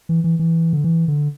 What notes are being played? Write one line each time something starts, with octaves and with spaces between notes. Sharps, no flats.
E3
E3
E3
D3
E3
D3